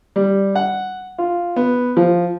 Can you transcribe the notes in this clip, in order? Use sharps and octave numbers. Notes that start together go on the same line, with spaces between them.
G3
F#5
F4
B3
F3